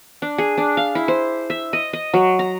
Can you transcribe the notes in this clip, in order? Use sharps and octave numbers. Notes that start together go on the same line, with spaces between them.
D4
G#4
D4
F5
E4
C5
E5
D#5
D#5
F#3
A#5